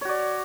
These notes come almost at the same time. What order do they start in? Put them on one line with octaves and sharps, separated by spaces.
C#5 F#4 D5